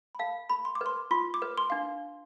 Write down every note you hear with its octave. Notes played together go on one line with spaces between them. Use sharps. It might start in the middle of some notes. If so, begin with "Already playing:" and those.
B5
F5 A5
B5
C6
D6
B4
C6
F4 C6
D6
B4
C6
D4 F5